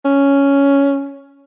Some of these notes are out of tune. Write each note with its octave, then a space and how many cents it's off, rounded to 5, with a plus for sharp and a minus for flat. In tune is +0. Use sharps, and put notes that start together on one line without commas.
C#4 +5